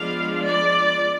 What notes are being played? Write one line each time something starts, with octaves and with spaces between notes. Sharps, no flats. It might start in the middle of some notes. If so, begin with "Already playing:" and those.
Already playing: F3 G#3 B3 D4 F5
D5